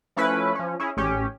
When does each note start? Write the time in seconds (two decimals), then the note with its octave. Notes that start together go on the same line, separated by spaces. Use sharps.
0.16 F3 A3 C#4 E4 B4
0.55 F3 C#4
0.80 C#4 E4 G#4
0.97 A1 C#4 G4